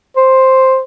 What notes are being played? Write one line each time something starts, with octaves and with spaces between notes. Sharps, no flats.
C5